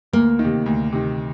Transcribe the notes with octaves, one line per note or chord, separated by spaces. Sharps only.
D2 A#3
D#3
C3
D2
C3 D#3